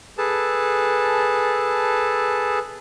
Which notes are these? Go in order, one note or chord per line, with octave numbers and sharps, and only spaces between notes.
G#4 A4 B4 A5